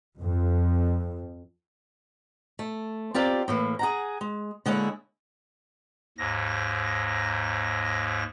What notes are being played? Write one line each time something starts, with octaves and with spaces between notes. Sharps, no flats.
F2
A3
C4 F4 G4 A#4 D5
A2 E3 A#3
G#4 F#5 A#5
G#3
D3 G#3 A#3 E4 C#5
D#2 G#2 A#6